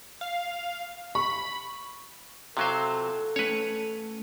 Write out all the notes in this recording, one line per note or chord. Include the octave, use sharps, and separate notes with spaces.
F5
B5 C#6
C3 F#3 F4 A4 C5 F5
A3 C#4 B4 C#5